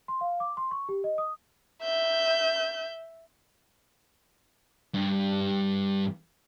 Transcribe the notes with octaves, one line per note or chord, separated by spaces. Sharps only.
C6
F5
D6
C6
C#6
G4
D#5
D#6
E5 G6
G2